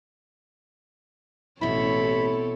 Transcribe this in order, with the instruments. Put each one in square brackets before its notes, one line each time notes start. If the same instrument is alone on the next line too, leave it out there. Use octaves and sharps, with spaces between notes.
[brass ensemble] A1 [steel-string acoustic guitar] B2 E4 [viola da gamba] C4 A4 C#5 [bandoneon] B5